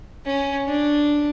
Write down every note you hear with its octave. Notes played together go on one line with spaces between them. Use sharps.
C#4
D4